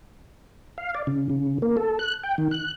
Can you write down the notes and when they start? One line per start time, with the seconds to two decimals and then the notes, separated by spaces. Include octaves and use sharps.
0.78 F5
0.95 D5
1.07 C#3
1.30 C#3
1.62 A#3
1.77 A4
1.99 F#6
2.23 G5
2.38 D#3
2.51 F#6